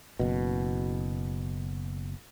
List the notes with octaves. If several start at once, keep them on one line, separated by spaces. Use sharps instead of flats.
F#1 B2